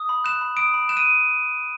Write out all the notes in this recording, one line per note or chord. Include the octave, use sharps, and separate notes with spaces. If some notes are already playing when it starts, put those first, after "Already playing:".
Already playing: D#6
B5
F#6 E7
B5
D#6 D7
B5
F#6 E7
D#7